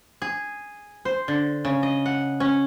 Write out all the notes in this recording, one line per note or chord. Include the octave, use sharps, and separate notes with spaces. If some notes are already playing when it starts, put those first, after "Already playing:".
G#4
C5
D3
C#3
D#5
F#5
C#4